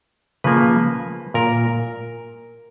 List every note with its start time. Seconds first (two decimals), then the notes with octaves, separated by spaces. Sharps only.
0.44 C#3 F3 A#3 B4
1.34 A#2 A#4